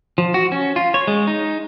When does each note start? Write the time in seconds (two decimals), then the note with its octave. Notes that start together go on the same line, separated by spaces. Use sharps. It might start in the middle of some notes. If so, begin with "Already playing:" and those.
0.18 F3
0.34 F#4
0.52 C#4
0.76 F4
0.94 C#5
1.08 G#3
1.27 D#4